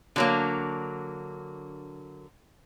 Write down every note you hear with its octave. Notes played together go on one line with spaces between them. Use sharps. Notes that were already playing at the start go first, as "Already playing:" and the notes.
D3 F#3 A#3